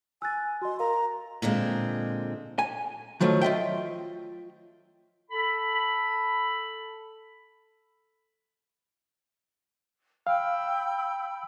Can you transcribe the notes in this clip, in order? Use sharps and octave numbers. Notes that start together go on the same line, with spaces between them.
G#5 E6 F#6 A6
F#4 D#5 C6
A#4 F5 A#5
A#2 D3 G#3 C4
G#5
D#3 F3 F#3 A3 F4
F4 D#5 E5 G5
A4 B5
F5 G5 B5 E6